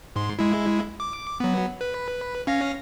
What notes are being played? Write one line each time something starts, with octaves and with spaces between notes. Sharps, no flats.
G#2 C6
G#3 E4
D6
F#3 B3
B4
C#4 F5 A#6